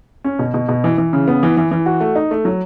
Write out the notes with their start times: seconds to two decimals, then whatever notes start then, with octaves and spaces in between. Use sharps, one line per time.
0.24 C#4
0.39 B2
0.54 B2
0.69 B2
0.84 E3
0.98 E3
1.13 C#3
1.28 B3
1.43 E3
1.57 E3
1.71 E3
1.86 F#4
2.01 A3
2.15 D#4
2.31 A3
2.45 F#3